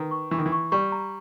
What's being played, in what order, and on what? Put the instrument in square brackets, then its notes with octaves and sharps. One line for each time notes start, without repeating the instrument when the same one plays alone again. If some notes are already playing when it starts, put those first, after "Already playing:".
Already playing: [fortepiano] D#3 [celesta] B4 A#5
[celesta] C#6
[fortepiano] E3 [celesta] C#6
[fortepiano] D#3
E3
[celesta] C#6
[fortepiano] G3 [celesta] C#6
[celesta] A#5